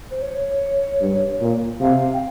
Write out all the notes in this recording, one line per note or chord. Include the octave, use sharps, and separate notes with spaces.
C5
C#5
G2
A#2
C3 F5
G5